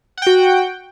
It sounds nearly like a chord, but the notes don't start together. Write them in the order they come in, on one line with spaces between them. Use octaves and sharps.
F#5 G5 F#4